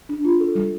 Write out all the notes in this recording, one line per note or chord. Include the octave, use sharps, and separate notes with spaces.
D4
F4
A4
G3